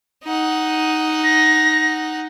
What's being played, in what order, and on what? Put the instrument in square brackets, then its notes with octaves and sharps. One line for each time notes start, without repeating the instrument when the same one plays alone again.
[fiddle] D#4 F#5
[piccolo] A#6